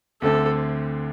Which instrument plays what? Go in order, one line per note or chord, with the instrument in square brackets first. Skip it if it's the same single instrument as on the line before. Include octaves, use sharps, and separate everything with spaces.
[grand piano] D2 D3 A3 C4 [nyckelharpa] A4